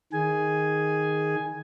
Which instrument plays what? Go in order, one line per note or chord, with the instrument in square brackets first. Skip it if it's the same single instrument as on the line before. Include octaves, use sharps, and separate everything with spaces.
[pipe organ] D#3 G#4 G#5